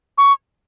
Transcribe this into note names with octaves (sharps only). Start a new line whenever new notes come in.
C#6